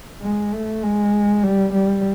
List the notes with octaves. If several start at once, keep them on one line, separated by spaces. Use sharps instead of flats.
G#3
A3
G#3
G3
G3